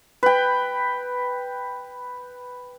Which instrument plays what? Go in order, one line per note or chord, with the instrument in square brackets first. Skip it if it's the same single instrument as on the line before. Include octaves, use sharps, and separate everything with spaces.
[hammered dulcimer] B4 G5